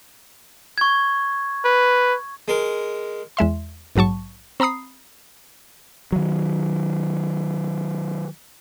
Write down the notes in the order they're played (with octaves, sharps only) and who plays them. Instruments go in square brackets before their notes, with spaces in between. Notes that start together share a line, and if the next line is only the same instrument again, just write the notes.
[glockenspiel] C#6 G#6
[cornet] B4
[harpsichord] G#3 A#4
[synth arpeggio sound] E2 G#3 E5 C6
A#1 G#2 F#3 A5 C#6
C4 A#5 B5 D#6 C7
[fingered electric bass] D#3 F#3